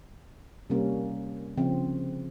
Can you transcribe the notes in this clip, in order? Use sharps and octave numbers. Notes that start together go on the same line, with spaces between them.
C3 G3 A#3 C#4
C#3 F3 C4